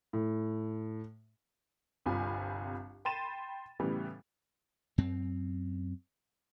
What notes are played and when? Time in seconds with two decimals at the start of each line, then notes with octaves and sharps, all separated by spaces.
0.13 A2
2.06 G1 C2 C4 F4 G#5 B5
3.05 G5 B5 C6 A6 D#7 E7
3.79 A2 C#3 E3 G3 B3
4.98 F#2 C4